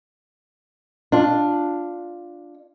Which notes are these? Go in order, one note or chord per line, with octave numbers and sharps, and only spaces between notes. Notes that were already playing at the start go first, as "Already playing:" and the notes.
D4 F4